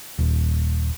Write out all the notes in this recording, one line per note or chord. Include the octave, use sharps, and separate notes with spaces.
D#1